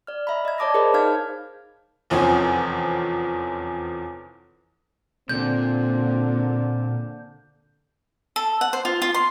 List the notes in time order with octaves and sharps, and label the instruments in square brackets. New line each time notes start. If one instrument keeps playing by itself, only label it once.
[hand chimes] D5 F6
D#5 E5 A#5 B5
D#5 G#6
C#5 D5 A5 D6 D#6 A#6
G#4 A#4 C5 D#5 A5 B5
D#4 F5 F6 G6 G#6
[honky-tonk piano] F1 E2 F3 C4 C#4 G#5
[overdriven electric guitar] A#2 [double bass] D3 A#3 [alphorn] C4 [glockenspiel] G6
[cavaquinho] A4
F#5
C5
F4
F4
C6